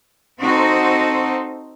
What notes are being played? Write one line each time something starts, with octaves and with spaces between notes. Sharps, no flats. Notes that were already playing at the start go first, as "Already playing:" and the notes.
C4 D#4 F#4 A4 C5